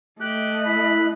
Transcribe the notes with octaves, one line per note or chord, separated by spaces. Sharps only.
A3 G4 D#5 F#6
E4 B5